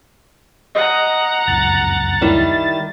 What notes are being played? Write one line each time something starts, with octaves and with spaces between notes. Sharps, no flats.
D#5 F#5 A#5
F1 C#2 F#2 A6
D#3 G3 E4